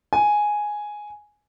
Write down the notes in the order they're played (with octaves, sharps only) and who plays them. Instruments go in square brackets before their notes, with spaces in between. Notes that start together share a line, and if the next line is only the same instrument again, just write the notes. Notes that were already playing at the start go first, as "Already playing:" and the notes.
[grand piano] G#5